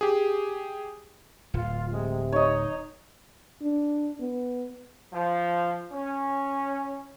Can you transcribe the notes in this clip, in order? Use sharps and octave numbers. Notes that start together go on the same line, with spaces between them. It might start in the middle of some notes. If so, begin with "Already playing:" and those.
G4 G#4
D1 F4
C3 G#3
D#4 C#5 D#5
D4
B3
F3
C#4